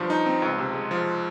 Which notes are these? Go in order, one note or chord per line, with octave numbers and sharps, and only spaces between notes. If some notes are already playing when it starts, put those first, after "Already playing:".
Already playing: G2 F3
D#4
C4
C#2
C3
G#3
F3